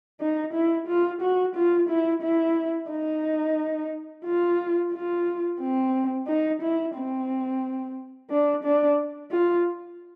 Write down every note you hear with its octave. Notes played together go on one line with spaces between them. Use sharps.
D#4
E4
F4
F#4
F4
E4
E4
D#4
F4
F4
C4
D#4
E4
C4
D4
D4
F4